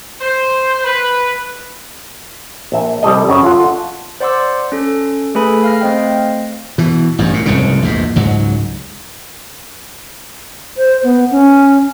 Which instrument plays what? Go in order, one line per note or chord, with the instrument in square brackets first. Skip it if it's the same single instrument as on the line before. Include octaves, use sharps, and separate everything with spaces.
[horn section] C5
B4
[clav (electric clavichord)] A#1 E5
C2 G3 A4 D#5
F#2 C#3 C#5
F4 A4 F#5
[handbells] C5 D5 F#5 C6 D6 E6
C#4 A4
A3 G#4 A4 B4 G#5 B5
F5 F6 A#6
A3 C4 C5 D#5 F5 G5
[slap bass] B2 E3
A1 G2
A#2
F1 C2 G#2 C#3
A#1 E2 G#2
C#2 G#2 F#3
[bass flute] C5
B3
C#4